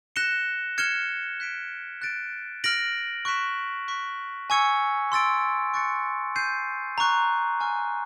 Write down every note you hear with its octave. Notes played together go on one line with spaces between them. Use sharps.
F#6 A#6 C#7 E7 G7
F6 G#6 C#7 E7 G7
F#6 B6 D7
F#6 A6 D7
F6 A#6 D7 F#7
C#6 F#6 B6 E7
C#6 F#6 B6
G#5 C#6 E6 G#6 C#7
C6 E6 A6 D7
C#6 F#6 A6 C#7
G6 C7 D#7
A#5 C#6 F#6
G#5 C#6 F6